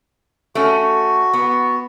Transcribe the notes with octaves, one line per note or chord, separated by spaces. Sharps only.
A3 C#4 F#4
B3